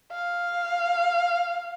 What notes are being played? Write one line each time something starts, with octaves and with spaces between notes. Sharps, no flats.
F5